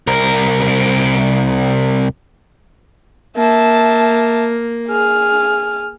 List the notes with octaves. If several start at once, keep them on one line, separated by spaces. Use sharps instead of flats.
C2 A#4
A#3 E5 A5
G#4 F6